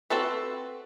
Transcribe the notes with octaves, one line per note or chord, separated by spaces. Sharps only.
C4 F#4 A4 B4